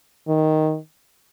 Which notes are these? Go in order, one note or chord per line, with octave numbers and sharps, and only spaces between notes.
D#3